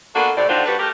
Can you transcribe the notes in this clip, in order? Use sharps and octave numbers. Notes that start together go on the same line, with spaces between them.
A#3 B3 D4 F#4 A4
A2 C3 D5
D3 D#3 D4 F4 F#4 C5
G3 D4 F#4 B4
A3 G4 A#4